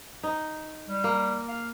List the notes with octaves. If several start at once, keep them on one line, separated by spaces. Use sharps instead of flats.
D#4
G3
A#3
F5